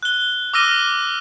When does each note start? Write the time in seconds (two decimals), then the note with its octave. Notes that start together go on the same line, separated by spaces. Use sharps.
0.03 F#6 G7
0.54 D6 E6 F6 A#6 D#7 G7